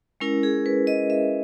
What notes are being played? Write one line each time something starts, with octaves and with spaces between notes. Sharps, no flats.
G#3 C#4 E4 A#4
G#4
B4
D#5
E5